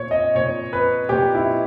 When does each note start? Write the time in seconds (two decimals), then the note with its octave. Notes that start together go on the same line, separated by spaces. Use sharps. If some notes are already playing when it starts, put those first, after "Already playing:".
Already playing: A#2 C#5
0.11 D#5
0.35 A#2 C#5
0.73 B4
1.09 A#2 G4
1.35 E4